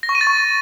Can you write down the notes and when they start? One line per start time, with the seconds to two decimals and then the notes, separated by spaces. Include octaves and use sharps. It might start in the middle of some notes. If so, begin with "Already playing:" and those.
0.03 A#6
0.09 C#6
0.15 D#7
0.21 A6
0.27 C#6